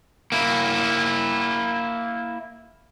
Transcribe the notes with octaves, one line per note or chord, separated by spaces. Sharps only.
A#3 E4